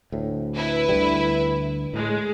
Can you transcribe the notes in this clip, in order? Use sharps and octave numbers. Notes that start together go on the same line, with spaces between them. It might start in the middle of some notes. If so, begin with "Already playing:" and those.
D2 A2
E4 B4
D2 D3 G3
A2 G#3